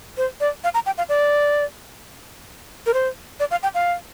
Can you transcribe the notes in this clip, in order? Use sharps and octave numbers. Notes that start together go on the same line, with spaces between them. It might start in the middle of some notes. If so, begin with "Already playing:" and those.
C5
D5
F5
A#5
G5
F5
D5
A#4
C5
D5
F5
G5
F5